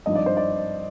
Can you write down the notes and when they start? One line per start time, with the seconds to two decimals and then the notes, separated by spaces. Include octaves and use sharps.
0.06 G#1 G2 F3 D#5
0.15 D5
0.26 C5
0.37 D5